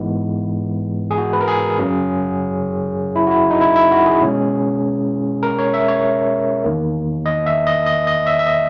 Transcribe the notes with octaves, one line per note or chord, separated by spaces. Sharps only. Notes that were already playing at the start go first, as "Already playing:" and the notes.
Already playing: G#2 E3 G#3 B3
G#4
F#4
B4
A#4
G#4
F#2 C#3 F#3 C#4
E4
F#4
E4
D#4
E4
E4
F#4
G#4
B2 G#3 C#4
A#4
C#5
E5
C#5
E2 D#3 A#3
D#5
E5
D#5
D#5
D#5
E5
E5
D#5